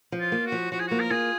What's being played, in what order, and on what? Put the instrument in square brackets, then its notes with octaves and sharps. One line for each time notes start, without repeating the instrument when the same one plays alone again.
[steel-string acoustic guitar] F3
[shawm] F4
[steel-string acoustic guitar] A#3
[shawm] F#4
[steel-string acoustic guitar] F3
[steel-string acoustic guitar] F3 [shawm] F#4
[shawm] G#4
[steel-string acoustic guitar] A#3 [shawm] F#4
[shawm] A#4
[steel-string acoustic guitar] F4 [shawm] G#4